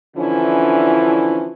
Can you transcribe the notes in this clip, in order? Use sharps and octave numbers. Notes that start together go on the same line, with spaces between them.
D3 E3 F3 C#4 D4 E4